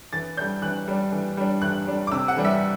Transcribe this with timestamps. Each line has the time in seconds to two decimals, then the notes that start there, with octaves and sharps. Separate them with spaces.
0.13 E3 A6
0.37 G3 D4 G6
0.62 E3 F#6
0.88 G3 D4
1.12 E3
1.37 G3 D4
1.62 E3 F#6
1.87 G3 D4
2.07 D6
2.11 C3 E6
2.28 F#5
2.36 E3 G3 D4
2.45 E5